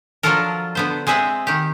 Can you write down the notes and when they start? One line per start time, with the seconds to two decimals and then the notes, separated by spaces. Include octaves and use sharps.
0.23 F3 F#3 D4 F4 A4 A#4
0.75 D3 B3 C5
1.07 G#3 C4 G#4 E5 F#5
1.47 D#3 G4